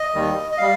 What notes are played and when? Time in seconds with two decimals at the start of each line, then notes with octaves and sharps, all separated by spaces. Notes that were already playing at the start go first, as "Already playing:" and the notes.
Already playing: D#5
0.14 D#2 D#3 G3
0.51 D#5
0.58 G3 F5